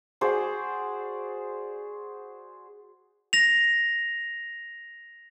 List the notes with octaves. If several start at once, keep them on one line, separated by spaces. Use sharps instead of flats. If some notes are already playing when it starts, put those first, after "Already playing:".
F#4 G#4 C5 D5
A#6 F7